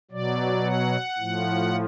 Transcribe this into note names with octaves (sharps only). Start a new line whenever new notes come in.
B2 F#3 D5
F#5
A2 F3